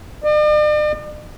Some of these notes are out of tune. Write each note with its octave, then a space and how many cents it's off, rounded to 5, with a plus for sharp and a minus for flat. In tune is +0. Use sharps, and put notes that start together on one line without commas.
D5 +45